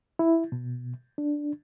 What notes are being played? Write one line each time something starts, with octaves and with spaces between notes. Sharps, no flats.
E4
B2
D4